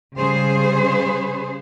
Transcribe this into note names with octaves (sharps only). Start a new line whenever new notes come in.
C#3 G3 G#4 C5